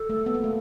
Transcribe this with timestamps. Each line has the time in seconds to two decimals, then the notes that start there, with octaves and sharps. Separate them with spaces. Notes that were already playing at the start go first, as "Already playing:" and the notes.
Already playing: A4
0.09 A3
0.26 B3
0.34 A#3
0.44 A3